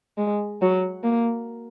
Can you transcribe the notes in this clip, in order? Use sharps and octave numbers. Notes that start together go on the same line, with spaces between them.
G#3
F#3
A#3